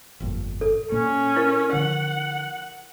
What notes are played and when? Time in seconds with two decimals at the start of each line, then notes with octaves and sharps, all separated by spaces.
0.20 G1 F2 A#2
0.61 A4
0.92 A#2 A#3 C#4
1.36 E4 A#4
1.73 D3 F3 F#5